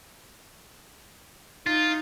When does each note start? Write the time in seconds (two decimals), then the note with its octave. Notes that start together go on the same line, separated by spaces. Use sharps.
1.67 D#4 F4